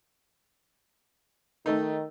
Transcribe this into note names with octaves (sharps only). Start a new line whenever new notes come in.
D#3 A3 D#4